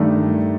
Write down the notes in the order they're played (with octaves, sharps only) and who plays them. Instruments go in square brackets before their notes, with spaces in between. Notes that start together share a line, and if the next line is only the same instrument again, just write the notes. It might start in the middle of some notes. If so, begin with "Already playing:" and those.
Already playing: [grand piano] G2 D#3 A3 D4